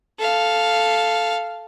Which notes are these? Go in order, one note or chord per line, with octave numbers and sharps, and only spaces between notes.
A4 F5